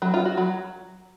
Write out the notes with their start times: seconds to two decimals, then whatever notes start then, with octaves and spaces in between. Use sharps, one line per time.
0.02 F#3
0.14 F4
0.26 F#4
0.37 F#3